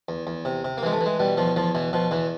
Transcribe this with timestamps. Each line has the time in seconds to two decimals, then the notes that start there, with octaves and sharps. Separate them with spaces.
0.09 E2
0.27 E2
0.45 C3
0.64 C3
0.78 A#3
0.83 E3 G#3
0.92 A3
1.01 E3
1.06 G#3
1.20 B2 G3
1.37 E2 F3
1.56 E2 F3
1.75 B2 E3
1.93 B2 F3
2.11 E2 E3